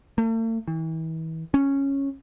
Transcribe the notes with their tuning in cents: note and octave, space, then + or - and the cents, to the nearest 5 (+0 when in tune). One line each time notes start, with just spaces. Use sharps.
A3 +45
E3 -35
C#4 -5